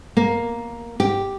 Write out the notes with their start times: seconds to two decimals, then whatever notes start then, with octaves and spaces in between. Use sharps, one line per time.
0.17 A#3
1.00 G4